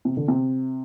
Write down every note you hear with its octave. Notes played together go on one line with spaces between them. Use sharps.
C3
D3
C3